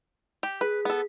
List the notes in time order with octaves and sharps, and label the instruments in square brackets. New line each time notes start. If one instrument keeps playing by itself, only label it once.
[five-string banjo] G4
[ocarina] G#4 [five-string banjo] B4
[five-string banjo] B3 A4